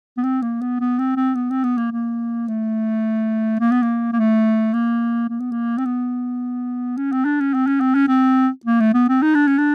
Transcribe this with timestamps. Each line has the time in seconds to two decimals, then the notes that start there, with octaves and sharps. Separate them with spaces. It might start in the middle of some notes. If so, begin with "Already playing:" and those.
0.17 B3
0.23 C4
0.42 A#3
0.61 B3
0.80 B3
0.99 C4
1.16 C4
1.35 B3
1.50 C4
1.64 B3
1.78 A#3
1.92 A#3
2.48 A3
3.60 A#3
3.72 B3
3.83 A#3
4.13 A#3
4.16 A3
4.73 A#3
5.29 A#3
5.40 B3
5.51 A#3
5.78 C4
5.85 B3
6.97 C#4
7.12 C4
7.25 D4
7.40 C#4
7.54 C4
7.67 C#4
7.81 C4
7.95 C#4
8.08 C4
8.66 A#3
8.80 A3
8.94 B3
9.09 C4
9.22 D#4
9.35 D4
9.47 C#4
9.58 D4